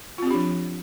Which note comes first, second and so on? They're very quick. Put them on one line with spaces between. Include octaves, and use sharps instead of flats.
F4 C4 G4 D4 F3